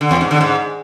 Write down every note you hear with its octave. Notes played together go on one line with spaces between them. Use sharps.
D3
E2
G#2
D3
G#2